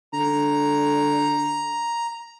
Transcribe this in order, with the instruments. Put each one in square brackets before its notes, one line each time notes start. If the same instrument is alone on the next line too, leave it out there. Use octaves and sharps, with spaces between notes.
[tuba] D3 [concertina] A#5